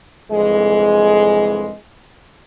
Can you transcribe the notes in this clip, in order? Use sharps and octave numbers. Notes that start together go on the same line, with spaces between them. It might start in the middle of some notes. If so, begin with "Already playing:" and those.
C2 F2 D3 E3 G#3